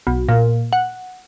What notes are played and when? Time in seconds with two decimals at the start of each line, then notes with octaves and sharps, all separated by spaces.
0.07 B1
0.29 A#2
0.73 F#5